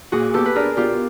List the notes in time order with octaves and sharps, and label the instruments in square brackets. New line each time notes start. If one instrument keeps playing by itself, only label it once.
[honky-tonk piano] A#2 [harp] F#4 G#4
[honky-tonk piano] B3 [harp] G4 A4
[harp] B4
[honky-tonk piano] D4 [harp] G#4 A#4
[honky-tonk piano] B2 [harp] F4 G4